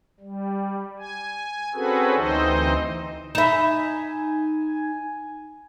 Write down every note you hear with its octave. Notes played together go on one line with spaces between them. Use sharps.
G3
G#5
C4 C#4 F#4 G#4 A4 B4
D2 E3 C4 D#4 C5 D#5
D#4 E5 G#5 B5 E7